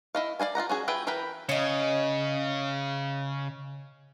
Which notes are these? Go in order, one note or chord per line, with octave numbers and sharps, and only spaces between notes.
E4 D#5 F5
D5 D#5 F5 G#5
F4 D#5 F#5 A#5
C#4 F#4 G#4
F4 G#4 B4 E5 G5
E3 A#4 B4 G5 B5
C#3 C#5 D#5